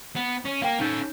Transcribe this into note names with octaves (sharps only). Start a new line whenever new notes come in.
B3
C#4
A#3 A#4 F5 G5
C#4 D#4 A4 G6